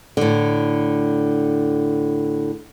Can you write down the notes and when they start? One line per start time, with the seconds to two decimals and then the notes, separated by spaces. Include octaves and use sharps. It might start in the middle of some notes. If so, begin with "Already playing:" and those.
0.17 A2 D3